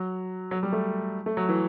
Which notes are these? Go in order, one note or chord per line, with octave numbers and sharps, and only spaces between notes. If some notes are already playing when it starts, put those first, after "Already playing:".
Already playing: F#3
F#3
G3
A3
A3
F#3
E3